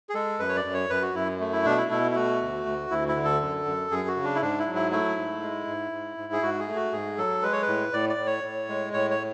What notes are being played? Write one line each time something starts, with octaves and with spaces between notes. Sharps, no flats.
G#4
G#3 A4
F#2 B4
C#5
D5
F#2
C#5
F#2 B4
F#4
F#2 E4
A3
E4
B2 D4
E4
B2 E4
E4
A3 F#4
D2
D2
D2 E4
E4
D3
A4
F#2
F#2
F#2 G#4
F#4
C#3
D4
E4
G#2 D4
E4
F#3
E4
A3 E4
G#2
G#3
G#2
G#2
G#2
G#4
G#2 F#4
G#4
A3
F#4
G#2 G#4
F#3 A4
G#3 B4
C#5
B4
A2
A2 D5
D5
A2
C#5
A2
G#3
A2 C#5
C#5